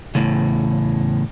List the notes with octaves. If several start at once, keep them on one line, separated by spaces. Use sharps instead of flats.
E2 A2 C#3